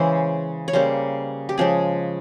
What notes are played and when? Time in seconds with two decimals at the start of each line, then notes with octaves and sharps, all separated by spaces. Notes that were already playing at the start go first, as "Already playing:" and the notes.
Already playing: C#3 E3 G#3 C5
0.68 C#5
0.73 C#3 G3 A#3 C5
1.49 G4
1.58 C#3 F3 G#3 G#4